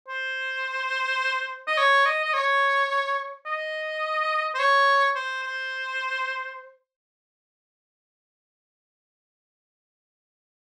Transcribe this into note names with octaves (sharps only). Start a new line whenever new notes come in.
C5
D#5
C#5
D#5
D#5
C#5
D#5
C5
C#5
C5
C5